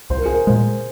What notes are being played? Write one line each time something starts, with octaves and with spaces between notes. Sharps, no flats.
C2 C5
A#4
G#4
A#4
A#2 G#3 C5